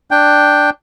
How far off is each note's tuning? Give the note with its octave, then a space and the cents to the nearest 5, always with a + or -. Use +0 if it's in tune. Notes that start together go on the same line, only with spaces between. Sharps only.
D4 +0 G5 +0